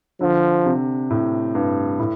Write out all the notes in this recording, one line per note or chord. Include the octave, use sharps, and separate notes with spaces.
D3 F3
C3
A2
G2
A2